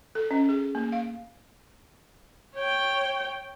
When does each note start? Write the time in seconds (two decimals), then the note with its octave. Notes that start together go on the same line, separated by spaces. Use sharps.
0.15 A4
0.31 C#4
0.49 G#4
0.75 A#3
0.92 F5
2.55 C#5 G5